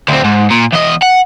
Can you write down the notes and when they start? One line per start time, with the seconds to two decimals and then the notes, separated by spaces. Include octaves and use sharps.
0.09 D2 C4
0.25 G#2
0.51 A#2
0.73 E2 D#5
1.03 F#5